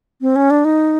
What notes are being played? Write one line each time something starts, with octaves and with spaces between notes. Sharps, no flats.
C4
C#4
D4
D#4